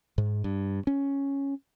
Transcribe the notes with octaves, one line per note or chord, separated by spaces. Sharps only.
G#2
G2
C#4